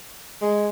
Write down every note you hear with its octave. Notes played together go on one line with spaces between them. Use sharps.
G#3